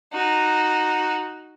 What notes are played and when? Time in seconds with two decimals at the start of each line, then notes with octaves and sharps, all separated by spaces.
0.13 D#4 F#4